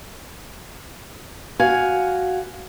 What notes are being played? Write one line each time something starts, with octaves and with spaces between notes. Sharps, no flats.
F#4 F5 G#5